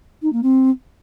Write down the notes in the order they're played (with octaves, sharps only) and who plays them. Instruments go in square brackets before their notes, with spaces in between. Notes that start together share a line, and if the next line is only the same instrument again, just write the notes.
[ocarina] D#4
A#3
C4